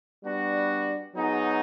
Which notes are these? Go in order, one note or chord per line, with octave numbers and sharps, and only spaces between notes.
G3 B3 D4 F#4
F#3 B3 D#4 G#4